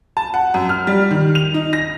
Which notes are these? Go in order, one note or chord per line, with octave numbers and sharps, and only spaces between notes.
A5
F#5
F#2
F6
G3
D#3
F7
D#4
A#6